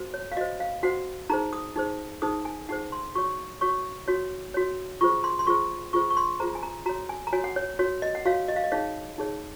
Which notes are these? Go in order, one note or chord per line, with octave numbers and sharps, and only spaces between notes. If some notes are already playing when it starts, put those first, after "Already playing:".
Already playing: F#4 C5
C#5
F5
F#4 C5 D#5
F5
F#4 C5 F#5
D#4 G#4 C5 A#5
D#6
D#4 G#4 C5
D#4 G#4 C5 D#6
G#5
D#4 G#4 C5 F#5
C6
F#4 C#5 C#6
F#4 C#5 C#6
F#4 C#5
F#4 C#5
F4 G#4 C5 C#6
C6
C6
F4 G#4 C5 C#6
F4 G#4 C5 C#6
C#6
C6
F4 G#4 C5 A#5
G#5
A#5
F#4 C#5 A#5
G#5
A#5
F#4 C#5 G#5
F#5
C#5
F#4 C#5
D#5
F#5
F#4 C#5 F5
D#5
F5
D#5
D#4 G#4 C#5 F5
D#4 G#4 C#5